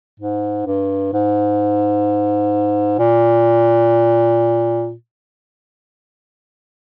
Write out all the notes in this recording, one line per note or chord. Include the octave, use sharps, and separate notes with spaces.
G#2
G2
G#2
A#2